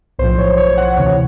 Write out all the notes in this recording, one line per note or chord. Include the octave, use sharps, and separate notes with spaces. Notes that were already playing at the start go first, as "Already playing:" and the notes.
B1 A2 F3 C5
C#5
C#5
F#5
D2 C3 E3 C#5